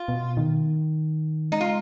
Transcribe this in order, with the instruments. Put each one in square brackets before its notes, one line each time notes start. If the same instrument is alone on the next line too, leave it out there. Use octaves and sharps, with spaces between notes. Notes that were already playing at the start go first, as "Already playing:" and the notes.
Already playing: [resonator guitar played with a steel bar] F4
[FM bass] B2
D#3
[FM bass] G#3 [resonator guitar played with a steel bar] D#4
[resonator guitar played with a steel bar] F4